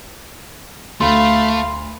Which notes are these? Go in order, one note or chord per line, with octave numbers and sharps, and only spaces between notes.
D2 A3 F5 B5 C6